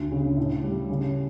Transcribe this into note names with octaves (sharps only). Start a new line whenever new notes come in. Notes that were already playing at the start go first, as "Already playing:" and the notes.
Already playing: D2
C#3
A2
G3
C#3